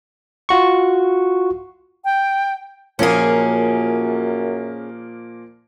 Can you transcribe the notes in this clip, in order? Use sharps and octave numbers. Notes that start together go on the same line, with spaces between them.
F4 F#4 C#6
G5
F#2 A#2 F3 A#3 C#4 G#4